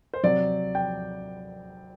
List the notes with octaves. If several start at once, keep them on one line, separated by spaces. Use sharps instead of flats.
C5
C3 F#3 D5
G5